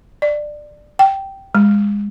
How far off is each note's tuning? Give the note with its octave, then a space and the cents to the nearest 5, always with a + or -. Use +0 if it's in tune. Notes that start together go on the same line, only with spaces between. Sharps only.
D5 +15
G5 -10
G#3 -25